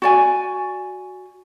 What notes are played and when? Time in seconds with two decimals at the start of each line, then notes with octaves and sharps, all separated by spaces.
0.02 F#4 D5 G#5